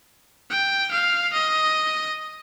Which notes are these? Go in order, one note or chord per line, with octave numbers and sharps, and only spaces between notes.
G5
F5
D#5